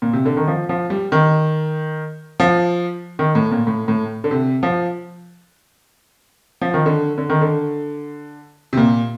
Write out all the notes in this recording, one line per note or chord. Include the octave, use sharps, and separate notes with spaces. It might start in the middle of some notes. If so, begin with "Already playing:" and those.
A#2
C3
D3
D#3
F3
F3
G3
D#3
F3
D#3
A2
A#2
A2
A2
D3
C3
F3
F3
D#3
D3
D3
D#3
D3
C3
A#2